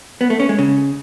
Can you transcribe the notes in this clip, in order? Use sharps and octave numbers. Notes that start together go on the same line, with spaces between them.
B3
A3
C#4
G#3
C#3